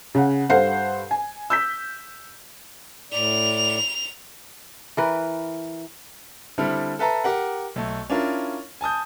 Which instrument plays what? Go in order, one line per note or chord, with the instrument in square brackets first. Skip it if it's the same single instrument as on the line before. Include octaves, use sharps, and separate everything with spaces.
[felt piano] C#3 F#5
G2 A4 C5 F5 F#5 C7
G#5
E6 G6 B6
[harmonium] A2 D5 [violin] F7
[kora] E3 A#4 B4
[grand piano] D3 G3 C4 E4 A4 F6
A4 B4 E5 A5 A#5
G4 A#4 F#5
B1 A3
C#4 D4 E4 F4 A#4
G#5 A5 D#6 G6